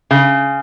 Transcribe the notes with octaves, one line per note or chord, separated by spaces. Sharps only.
C#3